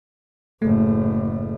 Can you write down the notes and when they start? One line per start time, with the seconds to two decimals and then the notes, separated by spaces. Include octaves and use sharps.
0.62 F#1 A2 A3